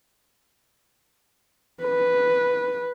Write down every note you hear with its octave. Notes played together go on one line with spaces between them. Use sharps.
B4